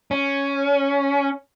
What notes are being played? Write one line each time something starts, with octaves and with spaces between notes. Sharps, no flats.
C#4